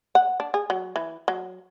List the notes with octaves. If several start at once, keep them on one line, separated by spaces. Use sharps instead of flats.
F#5
D4
G#4
F#3
E3
F#3